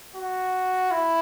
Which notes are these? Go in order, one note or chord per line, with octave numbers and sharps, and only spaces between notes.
F#4
E4